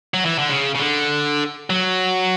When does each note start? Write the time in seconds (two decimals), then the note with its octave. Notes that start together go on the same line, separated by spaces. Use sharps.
0.14 F#3
0.25 E3
0.39 D3
0.50 C#3
0.75 C#3
0.79 D3
1.70 F#3